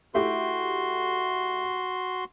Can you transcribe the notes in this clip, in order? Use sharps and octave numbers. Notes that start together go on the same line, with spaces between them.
A3 E4 F#4 G4 C6